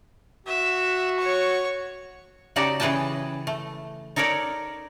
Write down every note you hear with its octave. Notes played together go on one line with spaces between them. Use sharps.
F#4 E5
C#5 C#6
C#3 D#4 F#4 G4 D5 A5
C#3 E3 G#4 B4 G5 A5
A3
D#4 A4 A#4 C#5 D5